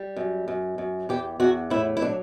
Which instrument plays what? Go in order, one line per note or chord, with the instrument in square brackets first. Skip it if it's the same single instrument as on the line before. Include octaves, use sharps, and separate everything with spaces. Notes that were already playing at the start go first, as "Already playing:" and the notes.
Already playing: [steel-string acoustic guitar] G3
F#2
F#2
F#2
E2 G4
E2 F#4
A2 E4
E4
F#3 D4